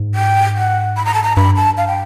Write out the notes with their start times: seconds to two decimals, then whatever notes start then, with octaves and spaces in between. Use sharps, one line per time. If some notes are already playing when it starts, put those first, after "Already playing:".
Already playing: G#2
0.15 G5
0.56 F#5
0.97 B5
1.05 A#5
1.14 A5
1.24 A#5
1.36 G2 B5
1.56 A5
1.78 F5
1.88 G5